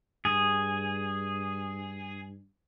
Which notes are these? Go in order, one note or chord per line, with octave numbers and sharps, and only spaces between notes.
G2 G#4